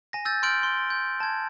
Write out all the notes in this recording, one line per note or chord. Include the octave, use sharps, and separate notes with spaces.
G#5 A#6
E6 G6 A6
C6 F6 G6 D7 F#7
C6
G6
A5 G#6